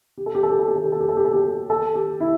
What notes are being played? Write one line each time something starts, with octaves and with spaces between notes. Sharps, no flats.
G4
A4
G4
A4
G4
A4
G4
A4
G4
A4
G4
A4
G4
A4
G4
A4
G4
E4